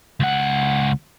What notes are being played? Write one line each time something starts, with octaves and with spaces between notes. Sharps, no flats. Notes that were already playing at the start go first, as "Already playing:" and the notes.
C#2 F#5